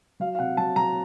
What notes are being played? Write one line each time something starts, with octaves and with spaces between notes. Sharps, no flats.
F#3 F5
F5
C3 F#5
F#3 A5
F#3 A#5